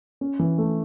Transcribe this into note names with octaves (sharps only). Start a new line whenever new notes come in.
C#4
E3
A3